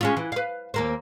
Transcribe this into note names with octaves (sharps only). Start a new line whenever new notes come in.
G#3 C#4 F4
E3
B4 F5
D#2 A#3 C4